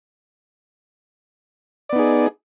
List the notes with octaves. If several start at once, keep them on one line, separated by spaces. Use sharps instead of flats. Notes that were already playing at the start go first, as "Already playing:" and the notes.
B3 D#4 G#4 D5